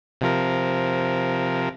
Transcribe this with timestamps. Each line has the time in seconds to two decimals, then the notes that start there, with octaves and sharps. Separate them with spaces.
0.21 C3 F3 A#4